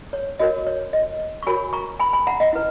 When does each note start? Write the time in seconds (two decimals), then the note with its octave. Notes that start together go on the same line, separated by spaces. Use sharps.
0.13 C#5
0.39 F#4 A#4 C#5 D#5
0.67 C#5
0.93 D#5
1.43 C#6
1.47 F#4 A#4 C#5 G#5 B5
1.73 A#5 C#6
2.00 G#5 B5
2.13 G#5 B5
2.27 F#5 A#5
2.40 D#5 F#5
2.53 E4 B4